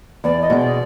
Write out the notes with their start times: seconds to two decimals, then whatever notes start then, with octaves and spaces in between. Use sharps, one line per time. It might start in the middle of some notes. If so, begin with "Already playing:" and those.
0.24 E2 D5
0.41 D#5
0.50 B2 G#3
0.59 D5